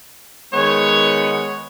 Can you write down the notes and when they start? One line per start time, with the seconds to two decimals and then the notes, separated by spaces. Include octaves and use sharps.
0.54 D#3 G#3 B3 C#5